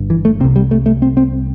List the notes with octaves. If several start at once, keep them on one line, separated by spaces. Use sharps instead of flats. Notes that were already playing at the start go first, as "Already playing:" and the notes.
Already playing: G1 G2
E3
A3
C2 C3 C4
G3
A3
A3
C4
C4